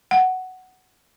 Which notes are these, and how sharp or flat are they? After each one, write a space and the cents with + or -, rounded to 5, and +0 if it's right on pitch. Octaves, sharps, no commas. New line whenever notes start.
F#5 +10